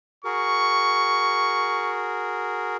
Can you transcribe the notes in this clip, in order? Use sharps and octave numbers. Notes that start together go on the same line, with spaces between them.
F#4 G#4 A#4 C#6